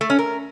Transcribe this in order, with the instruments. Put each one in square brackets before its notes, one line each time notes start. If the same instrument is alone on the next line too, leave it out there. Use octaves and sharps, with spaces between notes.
[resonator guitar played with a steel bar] A3
C#4
A#4